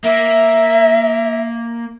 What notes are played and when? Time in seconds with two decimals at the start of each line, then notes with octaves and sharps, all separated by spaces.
0.04 A#3 E5